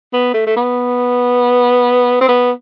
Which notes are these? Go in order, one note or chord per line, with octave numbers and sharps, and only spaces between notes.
B3
A3
A3
B3
C4
B3